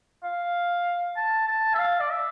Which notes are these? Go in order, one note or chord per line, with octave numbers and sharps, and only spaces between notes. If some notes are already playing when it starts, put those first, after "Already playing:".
F5
A5
A5
E5
F5
D5
E5